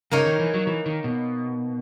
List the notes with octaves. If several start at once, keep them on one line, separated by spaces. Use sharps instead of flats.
C#3 A#3 D#4 A#4 C#5
D#3
E3
F#3
E3
D#3
B2